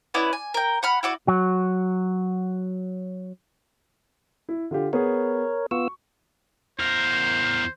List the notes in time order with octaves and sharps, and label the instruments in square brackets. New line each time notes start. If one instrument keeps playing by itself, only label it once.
[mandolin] B3 C#4 E4 D5
G#5
A#4 G5
F#5 B5 F6
E4 F#4 D5
[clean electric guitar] F#3 F#4
[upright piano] E4
D3 F4 G4
[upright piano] B3 G#4 [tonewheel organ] A#4 C#5
[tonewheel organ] B3 F4 E6 [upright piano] C#6
[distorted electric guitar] E2 A#4 [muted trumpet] C5